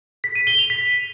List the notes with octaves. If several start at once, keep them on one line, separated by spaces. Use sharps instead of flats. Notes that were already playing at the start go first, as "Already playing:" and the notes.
B6
D#7
G7
F7
B6